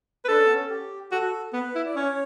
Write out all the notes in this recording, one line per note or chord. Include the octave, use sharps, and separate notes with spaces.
B4
D4 A4
C#4
B3
C#4
G4
F#4 A4
B3 B4
E4
D5
C#4 C#5